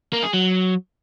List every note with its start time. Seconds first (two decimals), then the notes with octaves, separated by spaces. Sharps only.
0.13 A#3
0.23 G#4
0.34 F#3